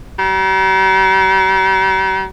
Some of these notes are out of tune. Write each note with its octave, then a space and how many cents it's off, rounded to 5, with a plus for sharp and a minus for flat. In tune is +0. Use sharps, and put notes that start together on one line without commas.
G3 -45